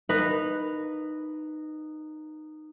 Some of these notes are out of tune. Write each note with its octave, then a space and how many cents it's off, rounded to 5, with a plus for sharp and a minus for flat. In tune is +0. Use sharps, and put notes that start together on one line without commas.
D#4 -15 B4 +0